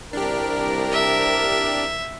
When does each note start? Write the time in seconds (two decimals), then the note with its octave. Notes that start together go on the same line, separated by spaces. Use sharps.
0.13 C2 D4 G4 A#4
0.92 E5